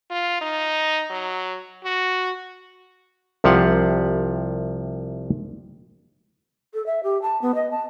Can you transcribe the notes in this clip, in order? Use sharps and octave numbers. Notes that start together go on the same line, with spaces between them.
F4
D#4
F#3
F#4
C2 C3 F3 G4 F5 F#5
A4
E5
G4
A5
B3
D#5
A5